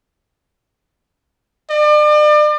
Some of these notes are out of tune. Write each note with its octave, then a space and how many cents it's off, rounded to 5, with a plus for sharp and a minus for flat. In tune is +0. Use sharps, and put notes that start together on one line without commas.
D5 +40